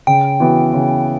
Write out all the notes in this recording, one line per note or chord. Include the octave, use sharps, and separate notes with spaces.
C#3 G5
E3 B3 F#4
C#3